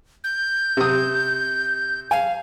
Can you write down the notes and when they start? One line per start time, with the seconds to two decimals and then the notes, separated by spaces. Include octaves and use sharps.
0.24 G6
0.77 C3 D#6
2.11 F5 G#5